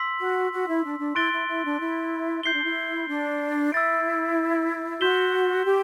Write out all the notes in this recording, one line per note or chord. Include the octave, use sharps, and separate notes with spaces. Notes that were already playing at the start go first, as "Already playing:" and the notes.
Already playing: C6 E6 B6 F#7
F#4
F#4
E4
D4
D4
E4 C6 F#6 A6 D7 G7
E4
E4
D4
E4
E4 G6 C7 G7
D4
E4
D4
E4 E6 A6 D7
F#4 C6 G6 B6 E7 G7
G4